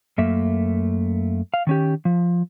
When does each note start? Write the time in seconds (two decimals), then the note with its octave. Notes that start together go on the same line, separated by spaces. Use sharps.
0.18 F#2 A3 A#3 E5
1.54 F5
1.67 D#3 C#4 G4
2.05 F3